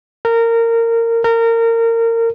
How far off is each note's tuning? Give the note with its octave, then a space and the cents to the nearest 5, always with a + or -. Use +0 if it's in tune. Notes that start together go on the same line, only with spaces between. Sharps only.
A#4 -20
A#4 -25